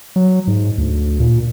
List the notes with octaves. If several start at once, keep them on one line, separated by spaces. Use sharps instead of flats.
F#3
G#2
D2
A#2